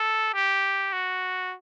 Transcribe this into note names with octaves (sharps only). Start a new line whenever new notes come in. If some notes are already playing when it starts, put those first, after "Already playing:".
Already playing: A4
G4
F#4